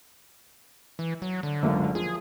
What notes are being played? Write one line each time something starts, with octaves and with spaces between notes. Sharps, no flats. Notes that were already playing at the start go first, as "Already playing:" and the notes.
E3
F#3
D3
F#1 C#2 E5
F3 G#4